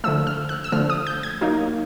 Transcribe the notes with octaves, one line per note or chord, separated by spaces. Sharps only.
D3 F3 A3 E6
F6
F#6
E6
D3 F3 A3 F6
D#6
G6
G#6
F#3 A#3 D#4